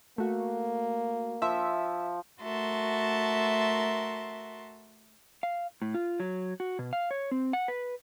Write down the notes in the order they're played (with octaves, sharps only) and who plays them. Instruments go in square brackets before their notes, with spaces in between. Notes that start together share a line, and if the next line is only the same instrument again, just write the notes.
[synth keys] A3 F#4 [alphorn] A#3
[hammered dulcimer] F3 [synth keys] E5
[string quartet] A3 F#4 A#4 E5 A5 C6
[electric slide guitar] F5
A2
F4
F#3
F#4
B2
F5
C#5
C4
F#5
B4